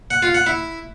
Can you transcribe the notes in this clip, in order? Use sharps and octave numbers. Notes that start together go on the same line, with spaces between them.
F#5
F4
F#5
E4